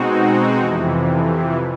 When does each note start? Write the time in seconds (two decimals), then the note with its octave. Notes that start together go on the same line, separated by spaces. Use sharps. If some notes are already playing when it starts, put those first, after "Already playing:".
Already playing: B2 G#3 C4 D#4 F#4
0.58 F2 C3 E3